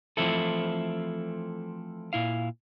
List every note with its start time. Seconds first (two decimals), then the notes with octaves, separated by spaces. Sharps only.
0.17 E3 F3 A3 C4 E4 A4
2.13 A#2 E4 F5